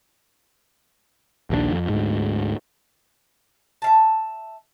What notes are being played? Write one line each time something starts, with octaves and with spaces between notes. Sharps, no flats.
A#1 D#2 D#3 D4
F2
D2 G#2
E5 F5 A5